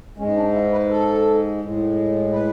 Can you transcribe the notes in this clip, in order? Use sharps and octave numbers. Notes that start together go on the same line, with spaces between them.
G#2 G#3 C#4
D4
E4
B4
A4
A2 G#3
B4